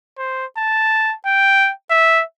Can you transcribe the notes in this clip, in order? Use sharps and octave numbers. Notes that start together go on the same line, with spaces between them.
C5
A5
G5
E5